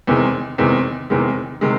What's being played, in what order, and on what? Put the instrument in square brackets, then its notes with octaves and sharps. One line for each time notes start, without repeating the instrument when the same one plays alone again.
[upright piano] E2 C3 D#3 G#3
E2 C3 D#3 G#3
E2 C3 D#3 G#3
C3 D#3 G#3